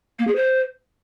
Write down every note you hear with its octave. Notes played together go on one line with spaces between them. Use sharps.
A#3
G#4
C5